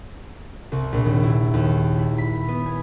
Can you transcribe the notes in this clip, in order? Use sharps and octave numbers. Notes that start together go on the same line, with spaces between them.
C2
A#1
D#2
E4
D#2
E4
B5
B3
G#5